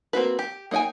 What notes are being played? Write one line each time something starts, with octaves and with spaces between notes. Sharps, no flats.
A#3 C4 F#4 B4
G4
A#3 D#4 D#5 G5 G#5